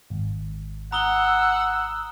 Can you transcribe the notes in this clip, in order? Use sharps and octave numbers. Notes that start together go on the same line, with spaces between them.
G#1
F#5 A#5 D#6 E6 G7